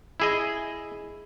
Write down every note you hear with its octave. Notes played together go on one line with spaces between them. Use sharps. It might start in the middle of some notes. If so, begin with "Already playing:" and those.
E4 G#4 D#5